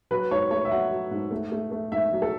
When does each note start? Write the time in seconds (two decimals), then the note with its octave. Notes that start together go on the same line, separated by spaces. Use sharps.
0.11 F#3 B4
0.31 G#2 C#5
0.51 A3 C#5
0.65 E5
0.71 F#3 F#5
0.91 F#3
1.11 G#2
1.31 A3
1.52 A3
1.71 A3
1.92 G#2 E5
2.12 F#3
2.22 A4